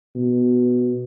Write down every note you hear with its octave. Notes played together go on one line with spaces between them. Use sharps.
B2